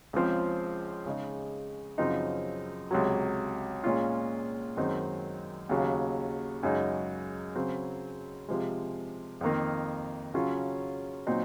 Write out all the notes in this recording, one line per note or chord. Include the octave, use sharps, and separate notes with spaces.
C#2 C#3 F3 C4
C#3 G#3 D#4
F#2 C#3 F3 C4 D#4
C#2 C3 F#3
A#2 G#3 C#4 F4
F#2 D#3 G#3 C4 D#4
D#2 C#3 F#3
F#2 C#3 G#3 D#4
C#3 F#3 C4
C3 F3 G#3
F2 D#3 A#3
C#3 F#3 C#4 F4
A#2 F#3 C4 D#4